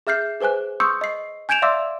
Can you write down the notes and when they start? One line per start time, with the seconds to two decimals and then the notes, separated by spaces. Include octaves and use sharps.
0.07 G#4 E5 F6 G6 C7
0.41 G#4 B4 C5 G#5 F#6
0.80 C6 C#6 D#6 E6 G6 C#7
1.01 D#5 C7
1.49 G#5 G6 G#6 D7 E7 F7
1.62 D5 E5 F5 C6 D6 E6